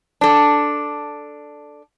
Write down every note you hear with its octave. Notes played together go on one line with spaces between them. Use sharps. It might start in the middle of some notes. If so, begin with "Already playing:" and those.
D4 A4